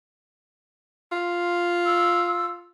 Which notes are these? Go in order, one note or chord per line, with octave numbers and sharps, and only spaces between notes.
F4
E6